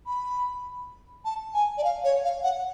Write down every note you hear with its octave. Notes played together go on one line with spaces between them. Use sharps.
B5
A5
G#5
D5
F5
C#5
F5
F#5